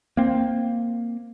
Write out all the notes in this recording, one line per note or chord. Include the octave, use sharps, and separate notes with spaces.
A#3 C4